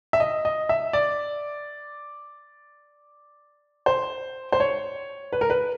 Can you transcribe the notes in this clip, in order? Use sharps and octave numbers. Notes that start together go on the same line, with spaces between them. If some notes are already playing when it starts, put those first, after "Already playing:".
E5
D#5
D#5
E5
D5
C5
C5
C#5
B4
A#4
B4